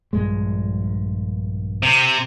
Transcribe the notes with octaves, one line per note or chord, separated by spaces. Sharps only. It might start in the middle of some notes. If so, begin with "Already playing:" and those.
A#1 G2 G#3
C3